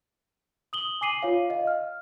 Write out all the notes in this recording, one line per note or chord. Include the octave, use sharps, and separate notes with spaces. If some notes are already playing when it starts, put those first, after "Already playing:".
D#6 F#7 G7
G#5 D6 C7 D#7 F#7
F4 C#5 F5
D#5 F5
F6